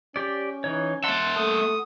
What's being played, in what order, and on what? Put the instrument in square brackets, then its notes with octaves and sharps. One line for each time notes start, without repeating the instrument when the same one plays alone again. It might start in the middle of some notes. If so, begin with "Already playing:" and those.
[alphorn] C#4 [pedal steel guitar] G4 D5
[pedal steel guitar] E3 C#5 [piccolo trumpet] D#4
[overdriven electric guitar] A#3 E5 [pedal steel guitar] F#5 C6 [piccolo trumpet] A5
[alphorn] A3 [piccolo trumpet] D#6